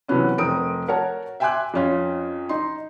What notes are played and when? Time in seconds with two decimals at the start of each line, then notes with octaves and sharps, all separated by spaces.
0.08 C3 E3 F#3 B3 C#4
0.38 F1 C4 A#4 A#5 D#6 D7
0.88 F#4 A#4 C#5 F#5 A5
1.40 E5 G5 G#5 C6 D6 F#6
1.74 F2 C#4 F4
2.49 D#4 C6